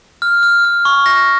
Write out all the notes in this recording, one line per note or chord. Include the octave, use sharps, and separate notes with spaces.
F6
F6
F6
C#6
A#6